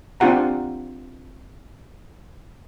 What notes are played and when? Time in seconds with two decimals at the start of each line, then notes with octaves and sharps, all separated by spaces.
0.20 C4 D4 F4 G4 F#5 A#5